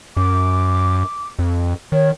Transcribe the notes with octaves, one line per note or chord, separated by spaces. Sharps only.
F#2 D6
F2
D#3 C#5